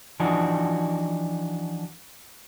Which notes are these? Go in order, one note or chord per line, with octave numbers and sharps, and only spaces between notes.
E3 F3 D4 D#4 F#4